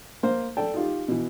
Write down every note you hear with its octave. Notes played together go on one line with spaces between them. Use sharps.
A#3 C5
A4 D5 G5 A5
D#4 F4 G4
B2 E3